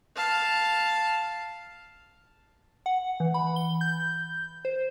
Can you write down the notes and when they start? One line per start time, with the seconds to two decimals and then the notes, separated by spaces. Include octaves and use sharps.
0.16 F5 A5
2.86 F#5
3.20 E3
3.34 B5
3.56 G7
3.81 G6
4.65 C5